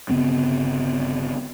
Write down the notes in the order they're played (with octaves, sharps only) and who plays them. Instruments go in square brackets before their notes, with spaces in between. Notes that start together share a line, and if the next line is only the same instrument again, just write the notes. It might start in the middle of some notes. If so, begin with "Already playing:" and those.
[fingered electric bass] G1 C#3 B3 C4